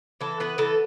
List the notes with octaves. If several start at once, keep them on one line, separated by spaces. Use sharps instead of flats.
E3 A4
B3 B4
E3 A4